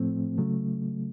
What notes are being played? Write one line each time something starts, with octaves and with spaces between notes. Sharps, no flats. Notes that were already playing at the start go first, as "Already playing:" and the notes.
Already playing: A2 F3 A3 C4
C#3 F#3 A3